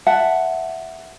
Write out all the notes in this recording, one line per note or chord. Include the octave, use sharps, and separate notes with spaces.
E5 F#5 A5